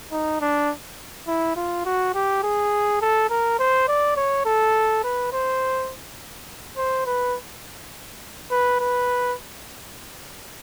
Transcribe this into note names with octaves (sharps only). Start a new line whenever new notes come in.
D#4
D4
E4
F4
F#4
G4
G#4
A4
A#4
C5
D5
C#5
A4
B4
C5
C5
B4
B4
B4